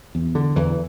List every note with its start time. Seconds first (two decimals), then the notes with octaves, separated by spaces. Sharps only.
0.15 E2
0.35 D3
0.56 E2 E3